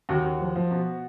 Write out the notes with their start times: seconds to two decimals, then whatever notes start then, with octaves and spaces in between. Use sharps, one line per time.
0.09 D#2 F#4 F#5
0.24 D#2
0.40 F3
0.55 F3
0.71 B2